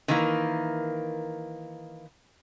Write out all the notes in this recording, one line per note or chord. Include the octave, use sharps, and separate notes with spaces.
D#3 E3 A#3